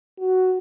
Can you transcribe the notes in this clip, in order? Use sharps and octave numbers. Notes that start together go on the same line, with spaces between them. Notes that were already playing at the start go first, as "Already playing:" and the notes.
F#4